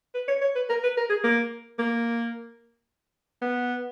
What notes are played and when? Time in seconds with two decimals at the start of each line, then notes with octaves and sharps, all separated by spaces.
0.15 B4
0.28 C#5
0.42 C#5
0.55 B4
0.69 A#4
0.84 B4
0.97 A#4
1.10 G#4
1.24 A#3
1.79 A#3
3.42 B3